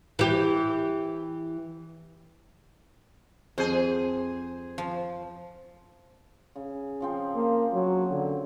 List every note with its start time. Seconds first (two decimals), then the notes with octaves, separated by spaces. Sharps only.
0.19 E3 G4
3.58 F2 G#4 C5
4.78 F3
6.56 C#3
7.00 C#3 F3 C4
7.36 A#3
7.73 F#3
8.11 D3